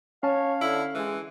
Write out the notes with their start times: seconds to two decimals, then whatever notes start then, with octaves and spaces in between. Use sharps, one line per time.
0.23 C#4 C#5 F5 A5
0.61 D3 E4
0.95 E3 G#3